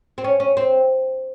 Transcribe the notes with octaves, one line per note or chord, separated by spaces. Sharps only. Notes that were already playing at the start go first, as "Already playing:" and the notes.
C4
C#4
C#4
C4